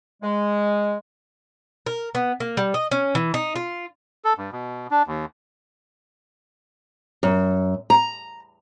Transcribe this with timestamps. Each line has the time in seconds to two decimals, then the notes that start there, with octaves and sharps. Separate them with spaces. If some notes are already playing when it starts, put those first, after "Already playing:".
0.23 G#3
1.86 A#4
2.15 B3
2.40 A#3
2.57 G3
2.74 D#5
2.91 C#4
3.15 E3
3.34 D#4
3.56 F4
4.25 A4
4.38 G2
4.52 B2
4.91 D4
5.07 D#2
7.23 F#2
7.90 A#5